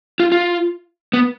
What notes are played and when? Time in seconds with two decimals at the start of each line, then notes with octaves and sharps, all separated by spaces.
0.20 F4
0.32 F4
1.13 B3